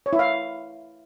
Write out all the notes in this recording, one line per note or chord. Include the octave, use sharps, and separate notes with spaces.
C#5
E4
F5